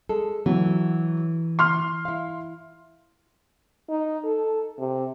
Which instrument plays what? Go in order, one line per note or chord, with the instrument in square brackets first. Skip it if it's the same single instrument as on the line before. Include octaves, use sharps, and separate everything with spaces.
[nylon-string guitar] G#3 A4
[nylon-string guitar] E3 [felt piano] F#3
[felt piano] C6 F6
[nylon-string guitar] E4 F5
[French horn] D#4
A4
C3